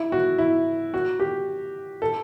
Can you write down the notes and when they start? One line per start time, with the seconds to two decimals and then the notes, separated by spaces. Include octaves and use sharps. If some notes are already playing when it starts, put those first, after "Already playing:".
Already playing: E4
0.12 F#4
0.38 E4
0.94 F#4
1.20 G4
2.02 A4